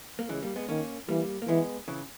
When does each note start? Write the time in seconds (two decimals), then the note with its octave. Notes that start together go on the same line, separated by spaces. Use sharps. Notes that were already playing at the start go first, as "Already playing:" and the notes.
0.19 A#3
0.29 C#3 E3 G#3
0.43 G3 A#3
0.56 G#3 B3
0.69 D#3 A#3 C#4
1.09 E3 G3 A#3
1.42 A#3
1.48 E3 G#3 B3
1.88 C#3 E3